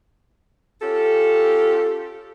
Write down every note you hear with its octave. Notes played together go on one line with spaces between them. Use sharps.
C#4 F4 G4 A4